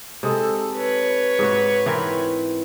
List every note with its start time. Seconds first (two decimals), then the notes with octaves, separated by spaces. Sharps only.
0.23 C3 G#3 D#4 A4
0.76 B4 C#5
1.39 G#2 F#4
1.86 E3 C4 A#4